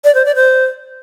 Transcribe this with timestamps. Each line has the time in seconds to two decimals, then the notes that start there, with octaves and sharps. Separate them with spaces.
0.04 D5
0.15 C5
0.25 D5
0.36 C5